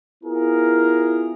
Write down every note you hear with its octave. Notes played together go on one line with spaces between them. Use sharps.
B3 E4 F4 G#4 A#4